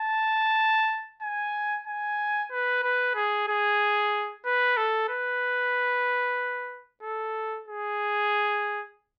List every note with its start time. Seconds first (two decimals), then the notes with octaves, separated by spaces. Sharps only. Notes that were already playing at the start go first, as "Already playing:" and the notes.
Already playing: A5
1.22 G#5
1.87 G#5
2.51 B4
2.83 B4
3.15 G#4
3.48 G#4
4.45 B4
4.77 A4
5.09 B4
7.03 A4
7.68 G#4